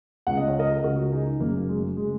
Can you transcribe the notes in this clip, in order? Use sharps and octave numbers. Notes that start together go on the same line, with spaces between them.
C#2 C#3 F#5
D#5
C#5
A#4 D#5
C#2 C#3 F#4 A#4
D#4 G#4
F#1 F#2 C#3 A#3
G#3
C#3 G#3